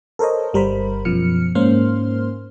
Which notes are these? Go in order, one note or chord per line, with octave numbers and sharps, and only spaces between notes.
A4 A#4 C5 C#5 D#5
G1 G3 A#4 C5 B5
F#2 B2 F3 F6 C#7
G#2 A#3 C#4 C5 C6 F6